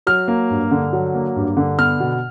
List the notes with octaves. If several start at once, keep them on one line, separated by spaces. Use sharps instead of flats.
F#3 F6
A#3
G2
D3
F#3
A#3
G2
D3
B3 F6
B2